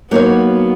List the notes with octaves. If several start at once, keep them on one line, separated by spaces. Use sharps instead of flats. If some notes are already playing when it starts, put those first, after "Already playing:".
F#3 A#3 B3 D#4 F#4 C#5